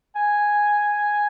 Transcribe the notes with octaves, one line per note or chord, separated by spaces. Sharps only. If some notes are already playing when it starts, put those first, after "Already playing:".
G#5